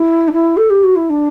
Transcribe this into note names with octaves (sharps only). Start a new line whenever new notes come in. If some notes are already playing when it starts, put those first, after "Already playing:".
Already playing: E4
D4
E4
A4
G4
F#4
E4
D4